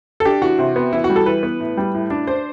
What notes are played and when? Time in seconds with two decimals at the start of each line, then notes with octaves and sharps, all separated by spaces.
0.20 A4
0.25 D4 G4
0.42 E3 F#4
0.59 C3
0.76 B3
0.93 E3 E4
1.04 F#4
1.10 G3
1.16 A4
1.26 E3 B4
1.43 B3
1.60 A2
1.77 G3
1.94 A2
2.10 D4
2.27 D4 C5